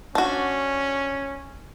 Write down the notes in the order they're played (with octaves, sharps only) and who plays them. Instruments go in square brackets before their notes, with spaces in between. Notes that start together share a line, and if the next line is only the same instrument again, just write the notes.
[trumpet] C#4 [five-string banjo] D4 F#4